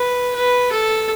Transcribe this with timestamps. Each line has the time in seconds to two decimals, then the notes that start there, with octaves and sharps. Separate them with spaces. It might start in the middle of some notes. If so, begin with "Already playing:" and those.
Already playing: B4
0.35 B4
0.72 A4